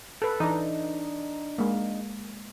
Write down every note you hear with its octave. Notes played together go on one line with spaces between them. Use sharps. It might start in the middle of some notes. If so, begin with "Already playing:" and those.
A4 B4
E3 D4 D#4
G#3 A#3